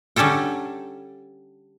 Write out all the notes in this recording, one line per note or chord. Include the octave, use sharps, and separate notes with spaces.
D3 G3 C#4 A4 G5